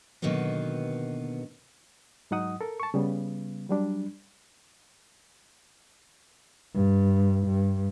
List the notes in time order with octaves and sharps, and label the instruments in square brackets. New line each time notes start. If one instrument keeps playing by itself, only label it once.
[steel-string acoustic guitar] B2 D3 D#3 F#3 A#3 B3
[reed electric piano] G#2 F#3 D#4 F#5 D#6
A4 A#4
A5 C#6
C#3 G3 B3
F#3 G3 D4
[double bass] G2
G2